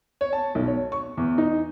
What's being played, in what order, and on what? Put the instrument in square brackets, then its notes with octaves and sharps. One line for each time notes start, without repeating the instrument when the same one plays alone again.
[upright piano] C#5
A5
B1
C#5
C#6
E2
D#4